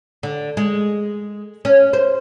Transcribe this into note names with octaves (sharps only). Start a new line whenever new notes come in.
D3
G#3
C#4
C5